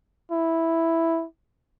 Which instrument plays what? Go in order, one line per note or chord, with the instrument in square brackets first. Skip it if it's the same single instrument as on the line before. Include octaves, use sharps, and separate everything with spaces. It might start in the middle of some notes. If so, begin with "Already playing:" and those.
[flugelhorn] E4